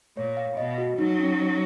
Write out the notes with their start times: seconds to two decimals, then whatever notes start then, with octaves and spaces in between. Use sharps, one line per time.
0.17 A#2 C#5
0.37 F5
0.57 B2 D#5
0.78 F#4
0.98 F#3 D#4
1.19 C#4
1.39 D#4